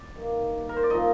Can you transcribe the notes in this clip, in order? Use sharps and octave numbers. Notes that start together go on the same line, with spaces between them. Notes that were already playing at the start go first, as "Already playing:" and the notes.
Already playing: D5
G2 D#3 A#3
A#4
C5
D5
A#2 F3 C4 D#4 D#5